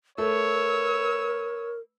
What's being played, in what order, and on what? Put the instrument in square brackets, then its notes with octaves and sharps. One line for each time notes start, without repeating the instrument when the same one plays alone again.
[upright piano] A3 [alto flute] A#4 [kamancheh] B4 E6 [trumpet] C#5